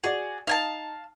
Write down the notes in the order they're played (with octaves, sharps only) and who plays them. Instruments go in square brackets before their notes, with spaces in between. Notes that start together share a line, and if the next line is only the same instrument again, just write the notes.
[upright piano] F#4 D5 [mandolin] G#4
[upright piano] D#4 [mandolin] F5 G#5 A5